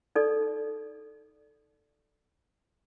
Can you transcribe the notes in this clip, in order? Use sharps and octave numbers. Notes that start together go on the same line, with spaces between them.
D#4 A4 D5